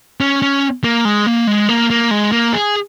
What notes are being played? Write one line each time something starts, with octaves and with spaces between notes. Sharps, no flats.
C#4
C#4
A#3
G#3
A#3
G#3
A#3
A#3
G#3
A#3
G#4